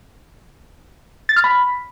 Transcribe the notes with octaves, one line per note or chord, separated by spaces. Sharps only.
A6
F6
B5